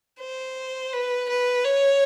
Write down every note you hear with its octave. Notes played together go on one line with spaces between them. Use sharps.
C5
B4
B4
C#5